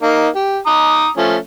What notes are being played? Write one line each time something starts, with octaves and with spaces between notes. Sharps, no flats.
A#3 D#4
G4
A#5 D6 D#6
F3 A3 C#4